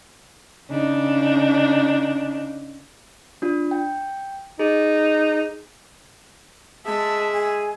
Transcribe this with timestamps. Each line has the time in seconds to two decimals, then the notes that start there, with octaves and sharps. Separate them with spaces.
0.69 C#3 D4 D#4
3.42 D4 F4
3.71 G5
4.59 D#4 G#4
6.85 G#3 E5 A5
7.32 G#4